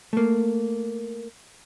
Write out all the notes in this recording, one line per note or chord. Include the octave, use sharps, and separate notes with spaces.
A3 A#3